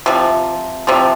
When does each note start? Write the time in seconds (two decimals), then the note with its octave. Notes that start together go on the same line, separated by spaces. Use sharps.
0.06 C3 F3
0.87 C3 F3